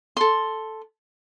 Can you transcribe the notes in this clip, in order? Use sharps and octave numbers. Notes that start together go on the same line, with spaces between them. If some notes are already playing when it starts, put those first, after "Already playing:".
A4 C6